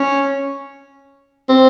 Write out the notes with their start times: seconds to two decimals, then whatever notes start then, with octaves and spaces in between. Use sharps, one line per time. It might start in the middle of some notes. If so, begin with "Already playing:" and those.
Already playing: C#4
1.49 C4